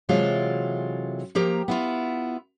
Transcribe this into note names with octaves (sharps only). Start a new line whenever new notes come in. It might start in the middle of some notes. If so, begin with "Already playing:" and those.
C3 E3 F#3 G#3 F4 A4
F3 A#3 G4 A#5
B3 E4 F4